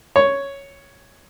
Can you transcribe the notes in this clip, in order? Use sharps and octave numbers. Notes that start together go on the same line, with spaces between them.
C#5